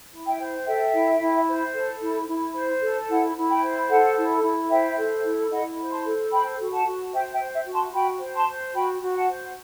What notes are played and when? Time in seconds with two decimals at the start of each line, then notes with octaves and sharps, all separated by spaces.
0.12 E4
0.26 E5 G5
0.39 C5
0.66 A4 E5 G5
0.93 E4
1.19 E4
1.47 C5
1.74 A4
2.01 E4
2.27 E4
2.54 C5
2.82 A4
3.09 E4 F#5 A5
3.35 E4
3.48 G5 B5
3.62 C5
3.89 A4 F#5 A5
4.16 E4
4.43 E4
4.69 C5 E5 G5
4.96 A4
5.25 E4
5.51 E4 D#5 F#5
5.78 C5
5.91 A5 C6
6.05 A4
6.31 C5 G5 B5
6.58 F#4
6.71 F#5 A5
6.86 F#4
7.12 C5 E5 G5
7.32 E5 G5
7.39 C5
7.52 E5
7.66 F#4
7.72 A5 C6
7.93 F#4 G5 B5
8.20 C5
8.33 A5 C6
8.47 C5
8.74 F#4 G5 B5
9.01 F#4
9.14 F#5 A5
9.27 C5